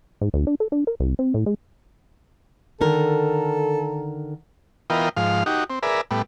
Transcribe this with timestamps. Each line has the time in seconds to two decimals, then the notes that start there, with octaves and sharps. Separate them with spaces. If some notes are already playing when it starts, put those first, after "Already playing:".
0.21 G#2
0.34 D2
0.47 D4
0.60 A4
0.72 D4
0.87 A#4
1.00 C2
1.19 C4
1.34 A2
1.46 G#3
2.81 D3 D#3 A4 A#4
4.90 E3 B3 F4 A#4 D#5 G5
5.17 G#2 F3 F5
5.46 D#4 F#4 G4
5.70 C4
5.83 G#4 A#4 B4 D5 E5
6.11 A2 G3 B3